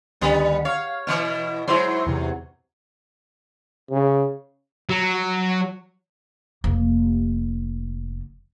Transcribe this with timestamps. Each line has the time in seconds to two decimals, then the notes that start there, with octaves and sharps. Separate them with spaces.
0.21 D2 D#3 G3 B3 B5
0.65 C#5 F5
1.07 B2 E3 E4 F6
1.68 G#2 F#3 E4 C5 C6
2.06 E2 C3
3.91 C#3
4.89 F#3
6.64 F1 A#3